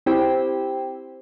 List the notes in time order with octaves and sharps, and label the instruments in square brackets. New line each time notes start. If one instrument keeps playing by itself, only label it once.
[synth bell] C4 E4 G4 C5 G5